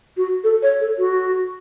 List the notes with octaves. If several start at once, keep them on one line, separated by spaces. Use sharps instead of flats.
F#4
A4
C#5
A4
F#4